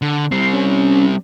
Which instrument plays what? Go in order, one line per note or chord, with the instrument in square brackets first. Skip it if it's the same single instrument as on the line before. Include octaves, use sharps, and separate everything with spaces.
[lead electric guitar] D3
[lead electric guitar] G3 C4 [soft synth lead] C7
[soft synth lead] C#4